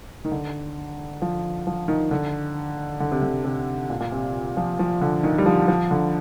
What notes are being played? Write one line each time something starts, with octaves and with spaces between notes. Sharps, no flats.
D#3
D3
F3
F3
D#3
D3
D3
C3
D3
C3
A#2
A#2
C3
F3
F3
D3
D#3
G3
F3
F3
D3